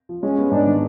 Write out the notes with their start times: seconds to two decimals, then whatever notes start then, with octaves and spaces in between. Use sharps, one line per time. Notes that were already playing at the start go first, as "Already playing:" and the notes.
0.09 F3
0.23 G#3 C#4
0.38 B3
0.51 G#2 D4
0.66 D#3